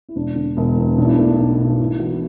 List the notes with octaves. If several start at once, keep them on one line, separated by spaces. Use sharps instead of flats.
E4
E1 D4
D3
E1
E2
B1 D4
E4
D4
A3
B1
B2
G#1 E4
E3 F#4